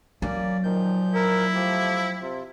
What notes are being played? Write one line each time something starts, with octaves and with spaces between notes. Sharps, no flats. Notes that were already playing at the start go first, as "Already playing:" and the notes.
F#3 A#3 C#4 D5
A#2 D#3 F3 G6
E4 A#4
F3 A3 G4
C3 F4